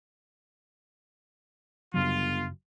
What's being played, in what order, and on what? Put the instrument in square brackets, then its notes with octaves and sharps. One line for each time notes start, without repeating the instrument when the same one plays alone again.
[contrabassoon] G1 [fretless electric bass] F#2 C#3 F#3 [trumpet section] F4